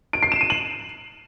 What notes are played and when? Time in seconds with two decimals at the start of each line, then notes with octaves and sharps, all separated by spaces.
0.13 D7
0.23 C7
0.32 E7
0.41 D#7
0.50 F#7